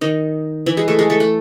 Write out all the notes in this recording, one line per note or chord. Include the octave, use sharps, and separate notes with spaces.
D#3 D#4
E3 E4
G#3 G#4
A3 A4
G#3 G#4
A3 A4
A3 A4